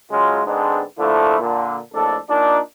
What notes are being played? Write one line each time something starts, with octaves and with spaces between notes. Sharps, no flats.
C#3 F#3 G#3 F4
G#2 D3 G#3 B3 C4 D4
D3 F3 A3 A#3 E4
A#2 D3
A#1 F2 A2 D4 A4
A#2 D4 D#4